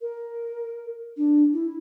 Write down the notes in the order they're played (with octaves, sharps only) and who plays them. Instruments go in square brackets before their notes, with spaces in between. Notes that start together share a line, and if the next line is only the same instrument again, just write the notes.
[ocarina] A#4
D4
E4